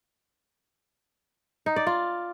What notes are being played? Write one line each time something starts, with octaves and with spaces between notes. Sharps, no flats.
D#4
D5
F4